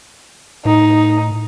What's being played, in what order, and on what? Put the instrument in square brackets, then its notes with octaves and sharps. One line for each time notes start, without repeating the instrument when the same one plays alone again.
[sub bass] A2 [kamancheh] D#4